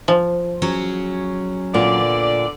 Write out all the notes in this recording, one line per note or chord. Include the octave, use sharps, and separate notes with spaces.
F3
F#3 C#4 G#4
A#2 D3 B3 F4 D5